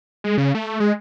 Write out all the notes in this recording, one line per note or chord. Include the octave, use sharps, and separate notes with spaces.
G#3
C#3
A3
G#3